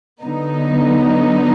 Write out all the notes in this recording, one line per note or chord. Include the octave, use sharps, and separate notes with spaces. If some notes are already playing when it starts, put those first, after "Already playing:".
D3 F#3 B3 D#4